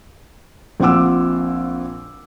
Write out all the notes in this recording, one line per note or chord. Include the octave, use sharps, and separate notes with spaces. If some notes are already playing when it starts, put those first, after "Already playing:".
A#1 C4 F4 F#5 D6 E6